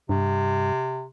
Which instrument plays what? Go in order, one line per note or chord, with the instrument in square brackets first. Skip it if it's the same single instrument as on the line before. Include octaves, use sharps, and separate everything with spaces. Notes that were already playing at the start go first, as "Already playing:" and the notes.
[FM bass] G2 [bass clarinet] C3